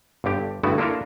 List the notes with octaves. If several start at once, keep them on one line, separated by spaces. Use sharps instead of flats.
G1 G2 D3 G4
G2 D3 A3 B3 E4 F#4
A#3 D4 E4 F4 A4 A#4